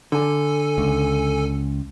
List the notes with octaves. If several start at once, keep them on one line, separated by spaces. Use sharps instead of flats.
D3 A4 G#5
C#2